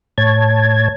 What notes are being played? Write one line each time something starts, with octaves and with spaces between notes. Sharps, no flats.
A2 C#5 A5 G#6